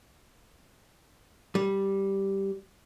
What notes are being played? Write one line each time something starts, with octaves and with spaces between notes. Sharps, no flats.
G3